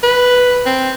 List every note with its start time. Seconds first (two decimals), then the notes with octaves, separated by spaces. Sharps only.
0.03 B4
0.66 C4